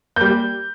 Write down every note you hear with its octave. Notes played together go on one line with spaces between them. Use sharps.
G3 A#3 G6